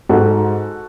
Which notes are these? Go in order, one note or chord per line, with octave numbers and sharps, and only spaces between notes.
G#2 F#4 A4